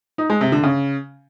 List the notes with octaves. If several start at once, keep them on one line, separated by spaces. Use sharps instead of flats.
D#4
G#3
C3
D3
C#3